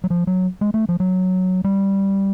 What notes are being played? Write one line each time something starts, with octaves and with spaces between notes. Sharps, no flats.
F#3
F3
F#3
G#3
A3
F3
F#3
G3